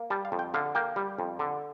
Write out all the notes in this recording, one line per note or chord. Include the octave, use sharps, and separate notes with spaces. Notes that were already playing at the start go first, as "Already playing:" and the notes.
Already playing: A#3
G3 A5
F5
F2
G5
D3 F5
A#3 G5
G3
F2
D3